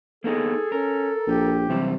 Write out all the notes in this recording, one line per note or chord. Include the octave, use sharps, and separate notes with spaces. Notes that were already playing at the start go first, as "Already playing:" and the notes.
A#3 B3 D#4 G#4 A4
C#4 A#4
A#1 G4
F#2 C3 E3 G3